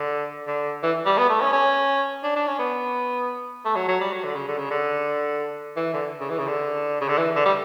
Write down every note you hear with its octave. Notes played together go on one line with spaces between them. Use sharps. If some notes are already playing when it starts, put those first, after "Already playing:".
Already playing: D3
D3
E3
G3
B3
A3
C#4
C#4
D4
D4
C#4
B3
A3
F#3
F#3
G3
F#3
D3
C#3
D3
C#3
D3
E3
D3
C#3
E3
C#3
D3
C#3
D3
E3
D3
G3